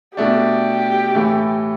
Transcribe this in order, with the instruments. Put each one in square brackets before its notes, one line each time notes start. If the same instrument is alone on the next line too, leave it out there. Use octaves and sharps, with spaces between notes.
[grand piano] B2 A3 D4 [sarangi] G4
[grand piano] A2 E3 A3